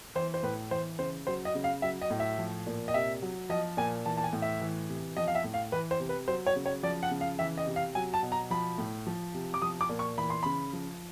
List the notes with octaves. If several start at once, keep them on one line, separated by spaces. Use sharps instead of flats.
E3 C5
C5
A2 B4
E3 C5
C#3 C5
F#3 C5
D#5
C#3
F5
F#3 E5
D#5
A2
E5
F3
A#2
D#5
C3 E5
F#3
F3 D#5
A#2 G#5
E3 A5
A5
G#5
A2
E5
E3
C3
F3 D#5
F5
E5
A2
F5
E3 B4
C5
C3
B4
F#3 C5
C#5
C#3
C#5
F3 D5
F#5
C#3
F5
E3 E5
D#5
C3
F5
F#3 G#5
A5
B2
A#5
F3 B5
A2
F3
C3
D6
F3 D#6
D6
A#2
C#6
E3 B5
C6
C#3 B5
F3